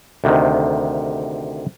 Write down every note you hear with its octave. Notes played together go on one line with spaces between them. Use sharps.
D2 C3 D#3